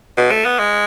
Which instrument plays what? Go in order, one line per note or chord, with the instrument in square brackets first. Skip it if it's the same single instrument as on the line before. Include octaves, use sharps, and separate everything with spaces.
[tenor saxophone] B2
A3
B3
G#3